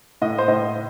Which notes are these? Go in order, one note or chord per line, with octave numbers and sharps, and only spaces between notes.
A2 D#5
C5
A2 D#5